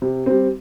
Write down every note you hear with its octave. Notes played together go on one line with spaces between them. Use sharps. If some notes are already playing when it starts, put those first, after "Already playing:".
C3
G3 C4